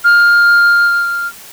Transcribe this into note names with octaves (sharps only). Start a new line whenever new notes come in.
F6